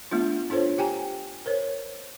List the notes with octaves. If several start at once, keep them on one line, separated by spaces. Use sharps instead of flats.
A3 B3 D4 F4
D4 F4 A4 C5 C#5
G4 G5 G#5 A#5
A#4 C5 C#5